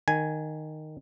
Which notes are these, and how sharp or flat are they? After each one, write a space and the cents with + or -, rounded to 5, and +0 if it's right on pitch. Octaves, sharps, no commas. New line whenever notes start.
D#3 -10 G#5 +0